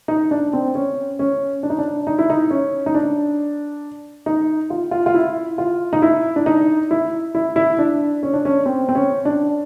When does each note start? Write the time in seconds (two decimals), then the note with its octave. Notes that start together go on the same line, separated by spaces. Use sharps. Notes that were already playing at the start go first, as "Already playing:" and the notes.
0.08 D#4
0.31 D4
0.53 C4
0.75 C#4
1.19 C#4
1.63 D4
1.70 D#4
1.79 D4
2.07 D#4
2.19 E4
2.30 D#4
2.51 C#4
2.86 D#4
2.95 D4
4.26 D#4
4.70 F4
4.91 F4
5.06 F4
5.14 E4
5.58 F4
5.93 D#4
6.02 E4
6.36 D4
6.46 D#4
6.91 E4
7.35 E4
7.56 E4
7.79 D4
8.23 C#4
8.34 D4
8.45 C#4
8.66 C4
8.89 C4
8.95 C#4
9.25 D4